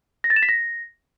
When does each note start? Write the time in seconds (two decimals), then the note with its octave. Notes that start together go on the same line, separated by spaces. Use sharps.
0.24 A#6
0.30 A6
0.36 E7
0.43 B6
0.49 A#6